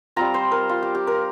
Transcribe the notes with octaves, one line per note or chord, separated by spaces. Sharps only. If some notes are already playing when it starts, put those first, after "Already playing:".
G3 C4 F4 A#5
C5
A#4
F4
G4
G4
A#4